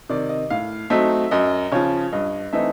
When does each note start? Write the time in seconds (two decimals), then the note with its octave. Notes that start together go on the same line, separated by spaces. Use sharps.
0.09 C3 D#3 D5
0.29 D#5
0.50 A2 F5
0.90 F#3 A3 C4 D#4 E5
1.31 F#2 D#5
1.72 C#3 F3 C#5
2.12 G2 D#5
2.53 E3 A3 C4 D#4 E5